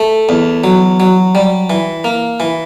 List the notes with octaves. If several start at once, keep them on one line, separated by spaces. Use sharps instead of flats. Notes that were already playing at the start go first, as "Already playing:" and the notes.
Already playing: A3
E2
F#3
F#3
G3
E3
A#3
E3